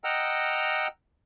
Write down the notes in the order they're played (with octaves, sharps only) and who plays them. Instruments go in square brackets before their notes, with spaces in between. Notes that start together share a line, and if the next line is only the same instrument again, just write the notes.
[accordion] D#5 F#5 G5 A#5 E6 F6